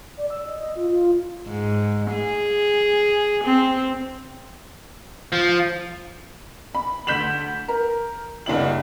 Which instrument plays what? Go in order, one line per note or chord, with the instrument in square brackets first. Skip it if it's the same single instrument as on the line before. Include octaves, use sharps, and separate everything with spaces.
[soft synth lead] D5
E6
D#5
D#5
F4
F4
[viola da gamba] G#2
G#4
C4
[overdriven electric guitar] F3
[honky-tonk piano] B5
D2 G6 B6 E7 F#7
A#4
F#1 C2 D4 E4 F#7